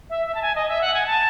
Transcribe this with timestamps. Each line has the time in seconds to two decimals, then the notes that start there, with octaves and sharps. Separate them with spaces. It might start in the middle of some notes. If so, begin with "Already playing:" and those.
0.10 E5
0.26 E5
0.35 A5
0.42 G#5
0.56 D#5
0.68 E5
0.81 F#5
0.94 G#5
1.07 A5